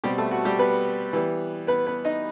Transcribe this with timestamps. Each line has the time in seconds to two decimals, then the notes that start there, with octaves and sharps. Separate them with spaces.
0.04 B2 G3 C4 G4
0.18 A3 A4
0.31 F#4
0.45 G3 G4
0.59 B3 B4
1.13 E3 G3 B3
1.67 B3 B4
1.86 B3 B4
2.05 D#4 D#5